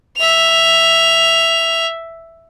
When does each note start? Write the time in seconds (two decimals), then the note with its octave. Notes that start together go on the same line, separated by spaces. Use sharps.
0.18 E5 F7